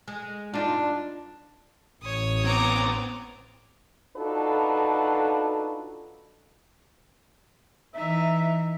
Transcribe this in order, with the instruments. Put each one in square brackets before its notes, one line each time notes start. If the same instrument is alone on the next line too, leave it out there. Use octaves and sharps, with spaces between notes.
[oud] G#3
[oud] G2 D#4 F4 [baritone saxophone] D4
[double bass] A1 [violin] C#5 D#6
[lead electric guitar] B3 C4 [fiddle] A#5 D6
[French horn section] D4 D#4 F4 F#4 A4 B4
[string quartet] E3 D#4 [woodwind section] E5